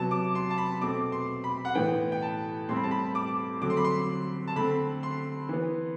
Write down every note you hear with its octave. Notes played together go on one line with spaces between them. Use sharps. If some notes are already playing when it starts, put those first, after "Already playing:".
Already playing: C3 F#3 B3 A5
D6
C6
A5
B5
B2 A3 C4 D6
C6
B5
F#5
A2 E3 B3 G5
G5
A5
A2 G3 C4 C6
B5
A5
B5
D6
D3 F#3 A3 C4 D6
C6
B5
C6
A5
D3 A3 C4 B5
C6
E3 B3